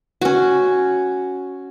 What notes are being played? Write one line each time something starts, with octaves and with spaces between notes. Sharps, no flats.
C#4 F#4